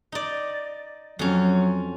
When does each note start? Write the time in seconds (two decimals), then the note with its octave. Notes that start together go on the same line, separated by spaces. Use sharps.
0.12 D#4 D5
1.19 F2 F#3 C#4